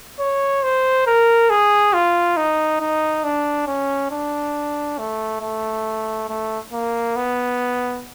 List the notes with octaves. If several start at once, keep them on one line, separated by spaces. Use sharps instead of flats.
C#5
C5
A#4
G#4
F4
D#4
D#4
D4
C#4
D4
A3
A3
A3
A#3
B3